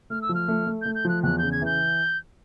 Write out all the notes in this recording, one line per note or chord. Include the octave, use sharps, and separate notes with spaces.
A3 F6
E6
F3
F6
A3
A3
A3 G6
G6
F3 F#6
E2 F#6
C#3 G6
G#6
E3 G6